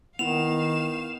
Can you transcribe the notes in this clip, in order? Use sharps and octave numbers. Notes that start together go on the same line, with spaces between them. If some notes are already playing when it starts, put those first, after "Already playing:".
D#3 B3 E4 F5 E7 F7